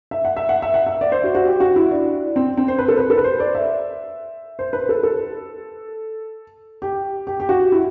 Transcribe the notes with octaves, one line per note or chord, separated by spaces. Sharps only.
E5
F#5
E5
F#5
E5
F#5
E5
D5
C5
F#4
F#4
G4
F#4
E4
D4
C4
C4
C5
B4
A4
B4
A4
B4
C5
D5
E5
C5
B4
A4
A4
G4
G4
G4
F#4
E4